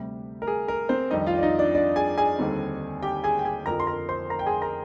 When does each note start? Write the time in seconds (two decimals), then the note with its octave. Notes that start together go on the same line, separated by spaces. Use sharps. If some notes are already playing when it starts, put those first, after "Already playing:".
Already playing: D2 C3 G3
0.42 A#4
0.47 G#4
0.68 A#4
0.89 C4 C5
1.11 F2 D#3 G3 D4 D#4 D#5
1.26 F4 F5
1.38 D5
1.43 D#4 D#5
1.59 D4 D5
1.74 D4 D5
1.96 G#4 G#5
2.18 G#4 G#5
2.38 D#2 D3 G3 C4 D#4
3.03 G4 G5
3.24 G#4 G#5
3.39 G5
3.45 G#4 G#5
3.66 F2 D3 F3 A#4 A#5
3.80 C6
3.87 A#4 A#5
4.09 C5 C6
4.30 A#4 A#5
4.39 G5
4.46 G#4 G#5
4.62 A#4 A#5